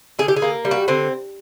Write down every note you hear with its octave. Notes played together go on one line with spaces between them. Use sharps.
D3 G#4
G4
G#4
A#3
G3
F#4
D3 C4